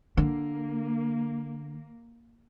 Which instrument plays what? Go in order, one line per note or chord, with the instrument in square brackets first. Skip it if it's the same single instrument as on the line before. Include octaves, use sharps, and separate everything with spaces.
[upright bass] D3 [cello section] A#3